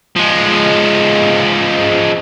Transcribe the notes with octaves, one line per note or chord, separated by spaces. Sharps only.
F3 G#3